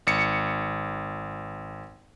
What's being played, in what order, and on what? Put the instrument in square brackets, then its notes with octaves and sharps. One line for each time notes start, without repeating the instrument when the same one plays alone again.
[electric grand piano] G#1 C#7